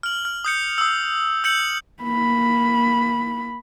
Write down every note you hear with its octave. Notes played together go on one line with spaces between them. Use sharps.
F6 F#7
F6
D#6 G6 C#7
D#6 E6
E6 G6 C#7 F#7
A#3 B5